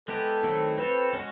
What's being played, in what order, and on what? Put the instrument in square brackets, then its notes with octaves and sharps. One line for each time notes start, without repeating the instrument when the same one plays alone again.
[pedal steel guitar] G#3 B3 E4 G4 [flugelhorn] A4
[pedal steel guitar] D#3 F#3 A3 C4 E4
[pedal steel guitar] C4 F4 A4 C#5 [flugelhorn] B4
[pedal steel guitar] G#3 C#4 F#4